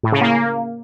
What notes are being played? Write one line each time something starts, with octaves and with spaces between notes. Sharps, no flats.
A2
C#3
A#3